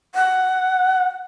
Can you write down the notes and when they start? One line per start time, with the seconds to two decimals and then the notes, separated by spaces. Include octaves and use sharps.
0.15 F#5